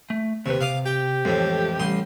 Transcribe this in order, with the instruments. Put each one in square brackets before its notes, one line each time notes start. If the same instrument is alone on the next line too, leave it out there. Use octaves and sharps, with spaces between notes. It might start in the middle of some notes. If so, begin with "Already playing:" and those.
[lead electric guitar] A3
[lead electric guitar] D#2 B4 [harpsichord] C3
[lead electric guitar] C3 [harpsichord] F5 D6 D#6
[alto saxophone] G4 [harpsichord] G5
[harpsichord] F2 A2 [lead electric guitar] E3 G#3
[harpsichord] A1 C6 D#6 [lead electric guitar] G3